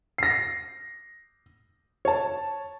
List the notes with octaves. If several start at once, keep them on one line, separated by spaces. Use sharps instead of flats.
A#6 C7
C#5 A5